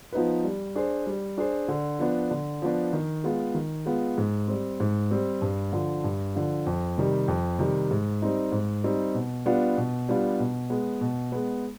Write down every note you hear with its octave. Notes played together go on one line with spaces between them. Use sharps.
F3 B3 D#4 B4
G3
D4 G#4 C5
G3
D4 G#4 C5
D3
F3 B3 D4
D3
F3 B3 D4
D#3
G#3 B3 F4
D#3
G#3 B3 F4
G#2
G3 C4
G#2
G3 C4
G2
D3 F3
G2
D3 F3
F2
C3 D#3 G3
F2
C3 D#3 G3
G#2
G3 C4 D#4
G#2
G3 C4 D#4
B2
G3 B3 D4 F4
B2
G3 B3 D4 F4
B2
G#3 B3
B2
G#3 B3